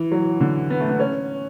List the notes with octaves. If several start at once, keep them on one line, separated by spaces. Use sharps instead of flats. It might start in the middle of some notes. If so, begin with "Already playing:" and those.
Already playing: E3
F#3
D3
B3
A3
B3
C#4